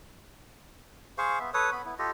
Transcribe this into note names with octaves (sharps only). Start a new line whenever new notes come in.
G#4 C5 F5 C#6
B3 E5
A4 B4 C#5 D#6
B3 B5
B3 E4
F4 G4 A4 D#5